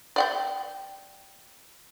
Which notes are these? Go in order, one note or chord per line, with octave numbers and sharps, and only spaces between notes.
D5 F#5 G5